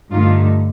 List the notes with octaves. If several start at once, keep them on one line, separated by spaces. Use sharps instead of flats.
G2 D3 A3 D#4 F4